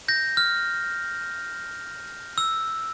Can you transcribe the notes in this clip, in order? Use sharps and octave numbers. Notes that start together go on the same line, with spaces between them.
G6 A#6
F6
E6